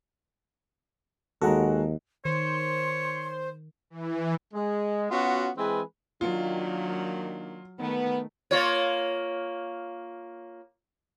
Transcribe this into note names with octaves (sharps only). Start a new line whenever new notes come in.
D#2 G#3 F#4 A4 F#5 A#5
D#3 C5 C#5 C6
E3
G#3
B3 C#4 F4 F#4
E3 G#3 C4 G#4 B4
D#3 F#3 A#3 D4 F4
D#3 A3 B3
A#3 F4 C#5